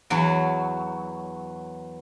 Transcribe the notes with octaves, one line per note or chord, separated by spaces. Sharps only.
E2 F#3